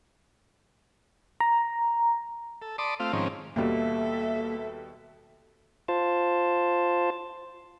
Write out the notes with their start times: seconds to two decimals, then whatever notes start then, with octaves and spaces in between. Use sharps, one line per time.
1.40 A#5
2.62 A4
2.78 D5 A5 B5 C6 D6 D#6
3.00 A3 C4 F4 F5
3.13 G#2 D#3 F3 C4 C#4
3.56 D#2 B2 G3 A#3 A4 E5
5.88 F4 C5 A5